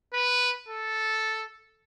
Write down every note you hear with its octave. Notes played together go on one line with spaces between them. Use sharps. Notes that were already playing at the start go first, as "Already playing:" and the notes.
B4
A4